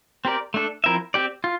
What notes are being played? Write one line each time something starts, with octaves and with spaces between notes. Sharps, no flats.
C4 G4 A#4 D5
A3 D4 A4
F3 C4 E4 A#4 E5
C4 G4 D5
F4